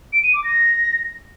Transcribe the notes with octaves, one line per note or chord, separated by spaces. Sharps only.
D7
D#7
D6
A#6